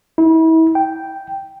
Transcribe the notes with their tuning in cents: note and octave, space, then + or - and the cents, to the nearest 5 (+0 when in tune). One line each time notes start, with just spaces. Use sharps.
E4 -35
G5 -5